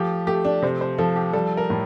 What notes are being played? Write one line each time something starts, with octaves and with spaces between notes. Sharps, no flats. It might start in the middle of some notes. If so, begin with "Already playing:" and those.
Already playing: F3 A3 G4
A3 G4
D4
C3 C5
C5
F3 A4
G4
G3 A4
A#4
A2